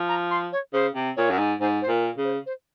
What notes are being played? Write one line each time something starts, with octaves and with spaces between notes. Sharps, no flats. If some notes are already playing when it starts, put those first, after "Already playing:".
Already playing: F3
A#5
C6
C#5
C#3 C5
C3
A#2 C#5
F#2
G#2
G#2 C5
C5
A#2
A#4
C#3
C5
C5